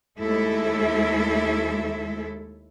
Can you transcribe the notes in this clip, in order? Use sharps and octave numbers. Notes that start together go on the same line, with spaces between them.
D#2 G#3 A3 E4 A4 E5